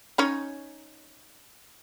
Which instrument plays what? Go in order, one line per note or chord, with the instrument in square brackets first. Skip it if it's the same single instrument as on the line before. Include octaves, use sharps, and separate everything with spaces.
[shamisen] C#4 D#4 C#5